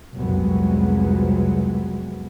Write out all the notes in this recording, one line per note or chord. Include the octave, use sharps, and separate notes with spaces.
C2 F2 C3 F#3 G#3 B3